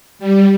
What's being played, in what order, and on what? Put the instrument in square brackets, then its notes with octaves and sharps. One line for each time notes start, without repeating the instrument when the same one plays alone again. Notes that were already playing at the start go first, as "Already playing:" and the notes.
[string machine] G3